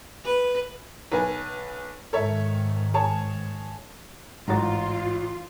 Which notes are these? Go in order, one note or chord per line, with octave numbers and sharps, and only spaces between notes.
B4
B1 B4 G#5
G#2 D#3 A4 C#5 E5
G#4 C#5 A5
A1 G#2 F4 F#4 A#5 A6